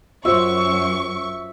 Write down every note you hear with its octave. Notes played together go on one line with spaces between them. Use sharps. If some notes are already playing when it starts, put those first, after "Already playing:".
F#2 F4 F#4 C5 E5 C#6